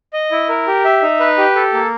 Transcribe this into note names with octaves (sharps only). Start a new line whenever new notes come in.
D#5
E4
A#4
G4
E5
D#4
B4
G4
A4
A#3